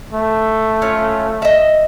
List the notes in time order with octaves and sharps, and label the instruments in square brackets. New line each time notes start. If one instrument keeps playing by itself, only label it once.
[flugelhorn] A3
[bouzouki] C#4 F4
D#5 E5